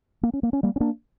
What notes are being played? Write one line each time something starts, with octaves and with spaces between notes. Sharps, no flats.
A#3
C#4
A#3
C#4
G3 A#3
C#4
A#3 D4